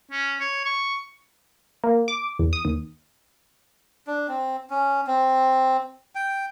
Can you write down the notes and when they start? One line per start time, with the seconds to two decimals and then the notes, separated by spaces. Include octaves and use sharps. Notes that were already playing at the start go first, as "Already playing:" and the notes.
0.11 C#4
0.40 C#5
0.65 C#6
1.84 A#3
2.08 D6
2.39 E2
2.53 D#6
2.65 D#2
4.07 D4
4.28 C4
4.70 C#4
5.07 C4
6.15 G5